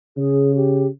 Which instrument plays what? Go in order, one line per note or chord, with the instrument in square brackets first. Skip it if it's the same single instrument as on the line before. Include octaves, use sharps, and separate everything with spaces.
[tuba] C#3 [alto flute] G#4
[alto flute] G4